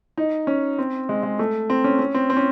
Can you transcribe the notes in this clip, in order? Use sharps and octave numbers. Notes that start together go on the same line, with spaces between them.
D#4
C#4
C4
G#3
G#3
A3
C4
C#4
C#4
C4
C4
C#4